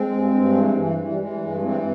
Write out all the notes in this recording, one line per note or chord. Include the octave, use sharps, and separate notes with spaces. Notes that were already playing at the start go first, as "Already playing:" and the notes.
Already playing: G#3 C4
G2
G2
E3
E3
E3
G3
E3 G#3
G3
G2 G#3
E3 G#3 C4